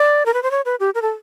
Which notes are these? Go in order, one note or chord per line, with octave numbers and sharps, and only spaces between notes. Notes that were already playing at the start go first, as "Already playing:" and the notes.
Already playing: D5
A#4
B4
C5
C#5
B4
G4
A#4
A4